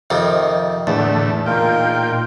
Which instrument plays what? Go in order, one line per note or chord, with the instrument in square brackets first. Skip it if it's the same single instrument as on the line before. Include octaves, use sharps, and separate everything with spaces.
[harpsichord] F2 C3 D#3
[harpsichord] E2 [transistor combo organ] A2 D3 A3
[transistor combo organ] A#2 G5 [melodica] D#4 F4 A#4